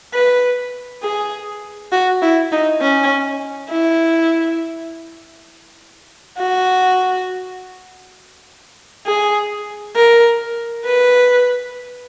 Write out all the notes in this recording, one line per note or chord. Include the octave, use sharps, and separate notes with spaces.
B4
G#4
F#4
E4
D#4
C#4
E4
F#4
G#4
A#4
B4